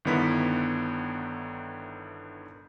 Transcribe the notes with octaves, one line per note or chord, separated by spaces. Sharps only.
G1 D3 D#3 B3 E4 B6